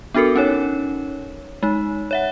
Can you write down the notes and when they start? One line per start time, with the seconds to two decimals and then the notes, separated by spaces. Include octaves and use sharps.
0.14 B3 D4 F#4 A4 A#4
0.36 C#4 D#4 C#5
1.63 G#3 D#4
2.11 C#5 E5 F#5